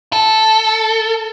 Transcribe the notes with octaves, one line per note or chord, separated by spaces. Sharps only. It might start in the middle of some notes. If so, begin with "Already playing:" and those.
A4